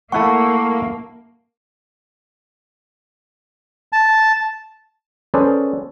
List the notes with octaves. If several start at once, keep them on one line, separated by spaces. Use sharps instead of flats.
A3 A#3 E4 F#5 A5 C#6
A5
C#4 G#4 A4 B4 C5 D5